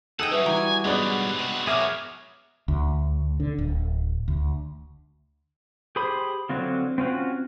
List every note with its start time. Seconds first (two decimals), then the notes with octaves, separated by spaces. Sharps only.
0.20 D#4 G#4 A4 F#5 G5 E6 D#7
0.31 F#3 G3 C#4 F#4 B4 E5 D#6
0.46 E3 G5 G#5 A#5
0.85 G#2 F#3 G#3 B3 D4
1.38 C3 F#4
1.67 B2 F#3 G#4 A#4 C#5 E5 D6 F6
2.68 D2
3.40 D3
3.58 D1
4.28 D2
5.96 G4 G#4 C5 B5 D#6
6.49 D3 F#3 C4 F4
6.98 C4 C#4 F4 F#4